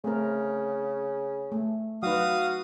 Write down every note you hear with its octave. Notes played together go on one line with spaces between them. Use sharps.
C#3 A3 C4 A#4
A3
F#3 D#4 F#4 B4 F5 D#6